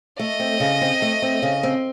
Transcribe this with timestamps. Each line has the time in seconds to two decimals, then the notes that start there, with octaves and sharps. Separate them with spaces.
0.19 A3 D#5
0.40 C4
0.60 C#3
0.81 C4
1.02 A3
1.22 C4
1.42 C#3
1.63 C4